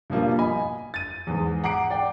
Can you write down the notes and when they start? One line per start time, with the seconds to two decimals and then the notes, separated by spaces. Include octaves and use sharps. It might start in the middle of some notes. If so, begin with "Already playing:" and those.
0.10 G2 B2 F3 G3 A#3 F4
0.39 D#5 G#5 B5
0.94 A6 D#7
1.27 E2 G#2
1.64 F#5 A#5 D6 C7 D7
1.90 D5 F#5 G5